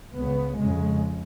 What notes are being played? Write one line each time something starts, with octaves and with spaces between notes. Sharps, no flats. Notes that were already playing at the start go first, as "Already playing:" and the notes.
C#2 C#3 B3
F2 C#3 G#3